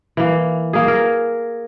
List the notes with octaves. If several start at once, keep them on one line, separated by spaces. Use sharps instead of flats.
E3 A#3
A#3 G#4
A#4